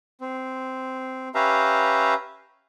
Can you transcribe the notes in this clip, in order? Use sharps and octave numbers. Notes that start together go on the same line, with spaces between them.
C4
C#4 G4 B4 E5 F5 A#5